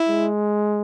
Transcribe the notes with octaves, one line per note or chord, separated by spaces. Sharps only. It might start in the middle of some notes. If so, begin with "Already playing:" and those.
Already playing: E4
G#3